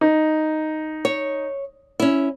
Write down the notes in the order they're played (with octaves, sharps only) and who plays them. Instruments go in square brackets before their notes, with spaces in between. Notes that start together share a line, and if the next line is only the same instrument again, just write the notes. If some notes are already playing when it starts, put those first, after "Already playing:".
[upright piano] D#4
[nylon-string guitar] C#5
C#4 E4